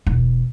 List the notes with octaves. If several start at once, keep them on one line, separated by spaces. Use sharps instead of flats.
E1